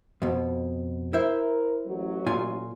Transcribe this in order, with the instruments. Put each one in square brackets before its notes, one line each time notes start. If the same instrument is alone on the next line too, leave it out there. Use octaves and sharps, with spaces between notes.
[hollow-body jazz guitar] F2 B2
[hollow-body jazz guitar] E4 C5 E5 [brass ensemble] A#4
[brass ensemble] A1 F#3
[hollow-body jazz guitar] A#2 F4 G#5